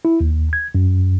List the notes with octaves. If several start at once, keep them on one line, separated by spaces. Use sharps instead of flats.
E4
D#2
G#6
F#2